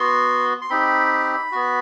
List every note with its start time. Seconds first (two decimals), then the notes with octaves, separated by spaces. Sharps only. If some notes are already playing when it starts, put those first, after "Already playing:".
Already playing: B3 F#4 C6
0.62 C6
0.70 C4 D#4 G4 B5
1.52 B3 F#4